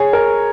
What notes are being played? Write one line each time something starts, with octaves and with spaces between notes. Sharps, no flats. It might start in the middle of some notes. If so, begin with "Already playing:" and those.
Already playing: G#4 C#5
A#4